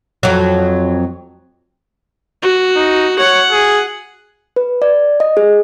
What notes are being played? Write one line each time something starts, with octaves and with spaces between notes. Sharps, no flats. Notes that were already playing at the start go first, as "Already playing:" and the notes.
F2 F#3
F#4
D#4
C#5 F#5
G#4
B4
D5
D#5
G#4